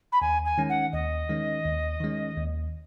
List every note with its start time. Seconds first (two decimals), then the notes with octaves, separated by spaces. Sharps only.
0.12 B5
0.21 D#2 G#5
0.45 G#5
0.58 D#3 G#3 C#4
0.69 F#5
0.92 D#2 D#5
1.29 D#3 G#3 C#4
1.66 D#2
2.00 D#3 G#3 C#4
2.37 D#2